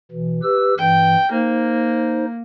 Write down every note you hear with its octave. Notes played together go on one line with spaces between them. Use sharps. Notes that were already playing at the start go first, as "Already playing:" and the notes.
B2 E3
G4 B4 E6
G2 E3 G5
A#3 D#4 C5